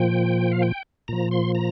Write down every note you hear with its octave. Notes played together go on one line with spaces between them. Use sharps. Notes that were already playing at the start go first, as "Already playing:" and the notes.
Already playing: A#2 F3 G5
F5
G5
A#2 F3 A#5
C6
A#5